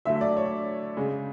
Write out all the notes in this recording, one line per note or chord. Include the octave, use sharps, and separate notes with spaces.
D3 F#3 A3 E5
D5
C#5
C#3 G#3